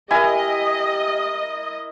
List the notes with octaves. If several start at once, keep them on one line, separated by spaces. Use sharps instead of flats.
E3 E4 G4 A#4 D#5 G#5